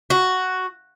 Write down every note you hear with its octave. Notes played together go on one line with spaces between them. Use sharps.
F#4